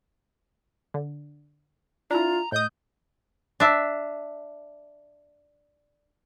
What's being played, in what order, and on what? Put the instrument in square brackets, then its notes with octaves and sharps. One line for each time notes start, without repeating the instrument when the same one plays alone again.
[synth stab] D3
[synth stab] D4 E4 [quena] F4 [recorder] A#5
[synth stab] A2 D#6 [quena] D#5 [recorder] G6
[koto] D4 E5